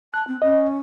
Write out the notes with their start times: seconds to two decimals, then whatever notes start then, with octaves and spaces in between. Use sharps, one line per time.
0.14 A5 F#6
0.27 C4
0.42 C#4 D#5